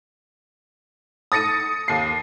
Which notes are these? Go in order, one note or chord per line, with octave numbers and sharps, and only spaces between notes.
D#6 A6 A#6 C#7 D#7
D#2 C7